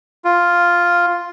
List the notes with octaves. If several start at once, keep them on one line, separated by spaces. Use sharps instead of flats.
F4